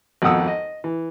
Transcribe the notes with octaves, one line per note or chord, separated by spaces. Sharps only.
G#1 F2 B2 F#5 D#6 E6
D#5
E3